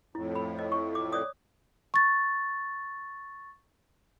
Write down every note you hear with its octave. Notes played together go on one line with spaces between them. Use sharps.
F2 A2 E4
B5
D#5
C#6
D6
C#5 D5 D#6
C#6 A6